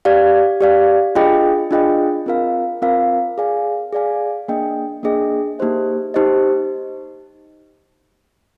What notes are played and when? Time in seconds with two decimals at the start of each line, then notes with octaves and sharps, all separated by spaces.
0.05 G4 D5 F5
0.61 G4 D5 F5
1.15 D4 F4 G#4 D#5 G5
1.71 D4 F4 G#4 D#5 G5
2.26 C4 F4 A#4 F5
2.82 C4 F4 A#4 F5
3.38 G#4 D5 F5 G#5
3.93 G#4 D5 F5 G#5
4.48 A#3 D4 G#4 D#5 G5
5.03 A#3 D4 G#4 D#5 G5
5.59 A#3 D#4 G4 C5 D#5
6.14 D#4 G4 C5 D#5